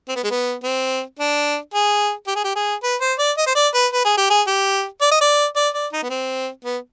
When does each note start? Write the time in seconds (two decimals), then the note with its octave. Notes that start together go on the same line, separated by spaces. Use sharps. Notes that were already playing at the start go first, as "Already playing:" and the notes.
0.09 C4
0.16 B3
0.24 G#3
0.31 B3
0.63 C4
1.19 D4
1.74 G#4
2.27 G4
2.36 G#4
2.44 G4
2.56 G#4
2.83 B4
3.01 C5
3.19 D5
3.37 D#5
3.47 C5
3.55 D5
3.74 B4
3.92 B4
4.05 G#4
4.17 G4
4.30 G#4
4.47 G4
5.01 D5
5.11 D#5
5.21 D5
5.56 D5
5.74 D5
5.93 D#4
6.03 B3
6.10 C4
6.65 B3